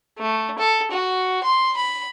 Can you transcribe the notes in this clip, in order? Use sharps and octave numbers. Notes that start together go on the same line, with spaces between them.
A3
A4
F#4
C6
B5